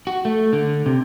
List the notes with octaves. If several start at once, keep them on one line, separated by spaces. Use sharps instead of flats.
F#4
A3
D3
C3